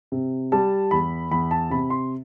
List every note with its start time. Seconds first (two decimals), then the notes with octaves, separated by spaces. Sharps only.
0.12 C3
0.52 G3 A5
0.91 E2 B5
1.31 E2 B5
1.51 A5
1.70 C3 B5
1.90 C6